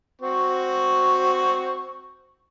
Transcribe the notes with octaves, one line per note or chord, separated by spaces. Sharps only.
C4 F#4 C#6